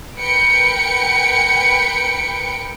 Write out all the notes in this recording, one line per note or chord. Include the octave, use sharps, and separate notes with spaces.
A#4 B4 G5 C#7 D7